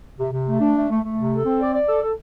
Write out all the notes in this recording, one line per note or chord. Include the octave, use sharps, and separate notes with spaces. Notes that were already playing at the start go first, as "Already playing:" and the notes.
C3
C3
A3
D4
A3
A3
A3
C3
A4
C4
D5
D5
A4
A4